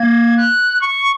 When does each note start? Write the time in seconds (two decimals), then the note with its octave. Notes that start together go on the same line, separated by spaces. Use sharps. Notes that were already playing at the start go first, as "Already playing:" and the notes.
Already playing: A#3 G#6
0.37 F#6
0.81 C#6